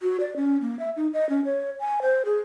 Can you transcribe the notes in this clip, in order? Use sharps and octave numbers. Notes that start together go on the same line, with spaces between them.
F#4
D5
C#4
A#3
E5
D#4
D#5
C#4
C#5
G#5
C5
G#4